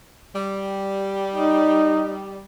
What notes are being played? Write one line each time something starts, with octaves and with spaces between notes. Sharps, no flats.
G3
D#4